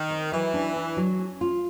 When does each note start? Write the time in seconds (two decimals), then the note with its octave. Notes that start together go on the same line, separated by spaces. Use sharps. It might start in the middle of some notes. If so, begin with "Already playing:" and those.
Already playing: D#3
0.10 C4
0.32 E3 F#3
0.54 D4
0.76 D4
0.97 F#3
1.19 C#4
1.41 F4